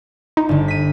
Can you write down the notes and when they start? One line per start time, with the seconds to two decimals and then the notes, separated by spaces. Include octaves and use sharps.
0.37 D#4
0.49 G1 D3
0.68 B6 D#7